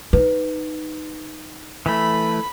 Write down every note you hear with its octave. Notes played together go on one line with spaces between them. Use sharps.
D#4 B4
E3 A3 B5